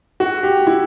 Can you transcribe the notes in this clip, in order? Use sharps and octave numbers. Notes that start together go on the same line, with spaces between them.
F#4
G4
E4